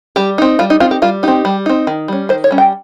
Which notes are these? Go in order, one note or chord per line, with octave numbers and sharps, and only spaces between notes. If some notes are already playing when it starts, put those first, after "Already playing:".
G3 G4
C4 D#4
G3 F4
D#4
C4 D#4 F4
G4
G3 F4
C4 D#4 G4
G3
C4 D#4
D#3
G3 C#4
D#3 C5
C#5
G3 C#4
G5